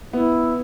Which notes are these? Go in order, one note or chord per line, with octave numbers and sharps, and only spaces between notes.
B3 E4